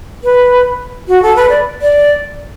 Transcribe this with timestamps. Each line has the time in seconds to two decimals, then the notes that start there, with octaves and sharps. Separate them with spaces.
0.24 B4
1.08 F#4
1.23 A4
1.36 B4
1.49 D5
1.82 D5